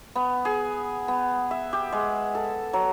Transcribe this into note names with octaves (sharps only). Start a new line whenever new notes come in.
B3
G#4
B3
E5
G4
G#3
A4
F#3